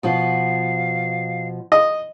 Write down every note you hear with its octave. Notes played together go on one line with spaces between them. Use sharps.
B2 F3 F4 F5
D#5